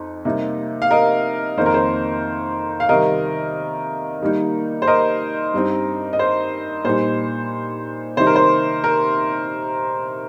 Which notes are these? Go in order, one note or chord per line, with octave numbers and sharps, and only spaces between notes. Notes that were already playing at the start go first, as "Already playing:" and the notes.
Already playing: F2 D#4
C3 G3 A#3 D#4
F5
A#4 D#5
F2 D#3 A#3 D#4 C5
A#4
C5
F5
C3 D#3 G3 A#4 D#5
D#3 G3 A#3 D#4
C5
A#4 D#5
G2 G3 C4 D#4
D#5
C5
A#2 G3 D#4 C5
C3 D#3 G3 D#4 C5
A#4
C5
A#4